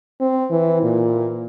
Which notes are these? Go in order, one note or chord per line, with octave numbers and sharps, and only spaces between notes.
C4
E3
A#2